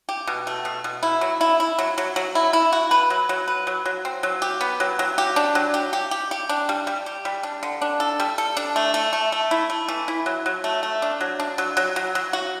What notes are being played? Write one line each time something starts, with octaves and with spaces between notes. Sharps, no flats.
G4
B2
A3
B2
B2
E4
F#3
E4
E4
F#3
F#3
F#3
E4
E4
F#4
B4
F#3
F#3
B4
F#3
F#3
C4
F#3
G4
B3
F#3
F#3
G4
D4
F#3
G4
G4
G4
G4
D4
G3
G3
G4
G3
D4
D3
D4
A4
G3
A4
D4
A3
A3
A3
A3
E4
A3
E3
E4
F#3
F#3
A3
A3
D4
F#3
D4
F#3
F#3
F#3
F#3
F#4